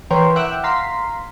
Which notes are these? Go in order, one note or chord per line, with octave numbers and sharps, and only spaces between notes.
E3 A#4 B4 C#5 G5 C6
E5 F#5 G5 D6 E6 F#6
F5 A#5 C6 B6